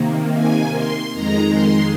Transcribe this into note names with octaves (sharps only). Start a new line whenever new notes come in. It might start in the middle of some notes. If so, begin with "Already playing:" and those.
Already playing: C3 D#3 A#3
G#5
C6
F2 D#3 G#3 A#5
C6